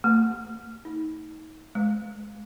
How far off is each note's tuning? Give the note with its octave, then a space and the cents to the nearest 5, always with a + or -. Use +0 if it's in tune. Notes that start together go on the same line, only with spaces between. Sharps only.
A3 +40
D#4 +25
G#3 +20